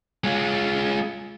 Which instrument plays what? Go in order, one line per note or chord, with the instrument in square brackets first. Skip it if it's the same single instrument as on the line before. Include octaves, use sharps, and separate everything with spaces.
[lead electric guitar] G#3 F4